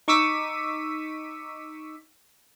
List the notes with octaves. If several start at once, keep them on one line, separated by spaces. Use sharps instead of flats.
D#4 C#6 D6 E6 B6 D#7